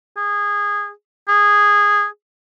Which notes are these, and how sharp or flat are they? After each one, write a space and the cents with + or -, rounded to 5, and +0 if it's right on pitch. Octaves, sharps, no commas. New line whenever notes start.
G#4 -20
G#4 -10